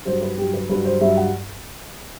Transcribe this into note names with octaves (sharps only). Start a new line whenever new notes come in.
G2 F#3 C5
B4
G2 F#3 G4
B4
G2 F#3 B4
C5
G2 F#3 E5
F#5